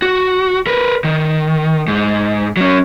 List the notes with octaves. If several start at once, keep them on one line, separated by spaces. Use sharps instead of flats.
F#4
A#4 B4
D#3
G#2
F#3 C#4